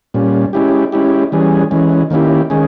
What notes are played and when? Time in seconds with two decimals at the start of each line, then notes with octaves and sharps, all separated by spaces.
0.14 A#2 G3 C#4
0.53 G#3 C#4 E4 G4
0.92 G#3 C#4 E4 G4
1.32 E3 G3 C#4 G#4
1.71 E3 G#3 C#4
2.10 D#3 A#3 C#4 E4 G4
2.50 D#3 G#3 C#4 G#4